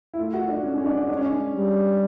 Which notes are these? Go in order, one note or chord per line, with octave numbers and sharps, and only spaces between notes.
E4
A3 F4
F#4
D4
G#3 C#4
C#4
D4
D4
C#4
D4
G3